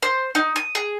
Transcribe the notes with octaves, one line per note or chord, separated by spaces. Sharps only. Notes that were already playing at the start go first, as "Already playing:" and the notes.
C5
D#4
D#6
G#4